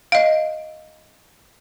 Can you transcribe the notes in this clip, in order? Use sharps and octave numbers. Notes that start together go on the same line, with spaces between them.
D#5 F5